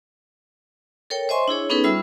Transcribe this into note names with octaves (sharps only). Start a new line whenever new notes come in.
A4 A#4 C#5 G5
C5 D#5 E5 G#5 C6 C#6
D4 E4 G#4 C#5
B3 C#4 D#4 G#4 A4 B4
G3 F4 E5 B5 E6